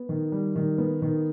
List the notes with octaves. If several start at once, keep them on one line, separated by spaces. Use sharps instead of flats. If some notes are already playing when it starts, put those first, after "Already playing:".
Already playing: B3
D#3
G3
D#3
B3
D#3